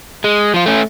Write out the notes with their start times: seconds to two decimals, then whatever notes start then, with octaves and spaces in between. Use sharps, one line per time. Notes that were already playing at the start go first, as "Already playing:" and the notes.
0.24 G#3
0.54 F3 F4
0.66 A3 C#4